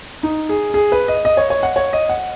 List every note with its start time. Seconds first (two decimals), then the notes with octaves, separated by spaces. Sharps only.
0.23 D#4
0.49 G#4
0.74 G#4
0.92 B4
1.08 D#5
1.25 D#5
1.37 C#5
1.50 C#5
1.63 F#5
1.76 C#5
1.93 D#5
2.09 F#5